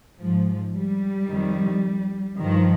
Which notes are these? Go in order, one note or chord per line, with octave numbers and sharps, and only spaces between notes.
G#2 F3
G3
F2 D#3
G2 D#3 F3